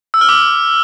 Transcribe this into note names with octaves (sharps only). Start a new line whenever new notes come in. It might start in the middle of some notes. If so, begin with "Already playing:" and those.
E6
F6
D6